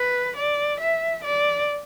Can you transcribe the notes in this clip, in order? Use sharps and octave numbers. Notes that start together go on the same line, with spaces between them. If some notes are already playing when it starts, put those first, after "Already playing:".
Already playing: B4
D5
E5
D5